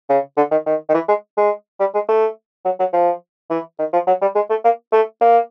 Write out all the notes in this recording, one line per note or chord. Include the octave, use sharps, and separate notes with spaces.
C#3
D3
D#3
D#3
D#3
E3
G#3
G#3
G3
G#3
A3
F#3
F#3
F3
E3
D#3
F3
F#3
G3
G#3
A3
A#3
A3
A#3